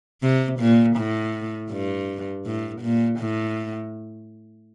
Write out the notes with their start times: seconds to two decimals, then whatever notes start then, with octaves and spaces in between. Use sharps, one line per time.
0.22 C3
0.59 A#2
0.97 A2
1.71 G2
2.46 A2
2.82 A#2
3.19 A2